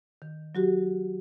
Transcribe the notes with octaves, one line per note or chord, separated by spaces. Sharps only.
D#3
F#3 F#4 G4